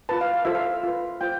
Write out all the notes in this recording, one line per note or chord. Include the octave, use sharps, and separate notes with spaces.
F4 B4 A5
F5
F5
F4 A4 C5 E5
F5
F4 B4
F4 C5 G5